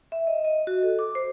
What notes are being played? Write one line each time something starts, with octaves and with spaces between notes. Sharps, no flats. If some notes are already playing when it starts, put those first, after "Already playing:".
E5
D#5
D#5
F#4
A4
D6
C5